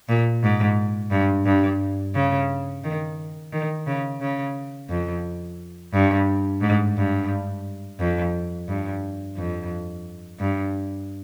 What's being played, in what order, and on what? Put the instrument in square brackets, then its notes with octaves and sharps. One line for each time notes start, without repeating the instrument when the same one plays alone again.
[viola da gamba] A#2
G#2
G2
G2
C#3
D#3
D#3
C#3
C#3
F2
G2
G#2
G2
F2
G2
F2
G2